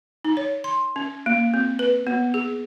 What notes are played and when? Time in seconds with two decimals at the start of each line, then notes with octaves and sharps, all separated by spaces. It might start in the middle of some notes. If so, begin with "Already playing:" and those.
0.24 D#4
0.37 C#5
0.64 C6
0.96 C#4
1.26 A#3
1.54 C4
1.79 B4
2.07 B3
2.34 G#4